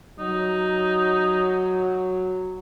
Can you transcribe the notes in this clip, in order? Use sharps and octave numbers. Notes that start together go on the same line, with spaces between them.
F#3 D#4